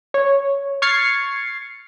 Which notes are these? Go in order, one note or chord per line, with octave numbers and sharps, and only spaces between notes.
C#5
C#6 F6 G#6 A6 C7 C#7